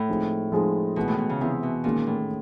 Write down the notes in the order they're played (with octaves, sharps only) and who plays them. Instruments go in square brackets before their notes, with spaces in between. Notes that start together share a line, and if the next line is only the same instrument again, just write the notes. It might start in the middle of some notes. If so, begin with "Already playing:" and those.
Already playing: [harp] A2
[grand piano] F3 G#3 C4 D#4 G#4
F3 G#3 C4 D#4 G#4
[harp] B2 [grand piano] E3 G#3 B3
[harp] A2
B2
C#3
[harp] C3 [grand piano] E3 G#3 B3
[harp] B2
[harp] A#2 [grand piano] D#3 G#3 C#4 F#4
[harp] A2